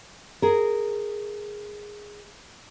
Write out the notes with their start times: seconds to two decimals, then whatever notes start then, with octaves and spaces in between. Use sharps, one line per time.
0.42 G#4 A#4